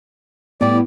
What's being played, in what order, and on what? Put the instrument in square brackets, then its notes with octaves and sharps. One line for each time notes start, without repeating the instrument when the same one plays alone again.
[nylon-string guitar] A2 G3 [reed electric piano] B3 [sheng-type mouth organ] D5